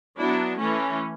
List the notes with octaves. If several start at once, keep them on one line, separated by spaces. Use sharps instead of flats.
F#3 B3 D4 E4
E3 A3 C#4